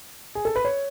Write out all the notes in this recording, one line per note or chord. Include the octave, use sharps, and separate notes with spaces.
G#4
A4
B4
C#5